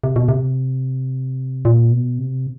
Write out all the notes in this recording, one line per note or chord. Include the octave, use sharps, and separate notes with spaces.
C3
B2
C3
A#2
B2
C3